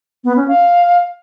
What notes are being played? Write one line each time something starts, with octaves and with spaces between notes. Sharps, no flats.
B3
C#4
F5